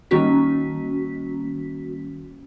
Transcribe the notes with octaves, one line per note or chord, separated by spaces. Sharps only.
D#3 G3 A#3 C#4 F#4 B6